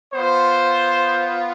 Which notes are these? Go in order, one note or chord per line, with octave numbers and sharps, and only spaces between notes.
B3 F4 C5